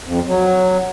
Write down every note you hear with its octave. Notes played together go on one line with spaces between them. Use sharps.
F2
F#3